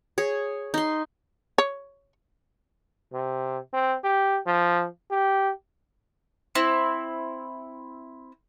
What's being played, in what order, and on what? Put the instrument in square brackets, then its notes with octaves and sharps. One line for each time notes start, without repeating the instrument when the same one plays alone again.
[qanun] G#4 C#5
D#4 C6
[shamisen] C#5
[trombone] C3
C4
G4
F3
G4
[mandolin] C4 E4